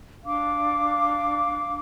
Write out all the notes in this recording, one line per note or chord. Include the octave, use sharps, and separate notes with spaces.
D4 F5 D6